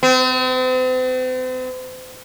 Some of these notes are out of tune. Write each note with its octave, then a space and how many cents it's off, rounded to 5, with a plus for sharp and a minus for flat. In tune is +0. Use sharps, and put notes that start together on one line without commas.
C4 -40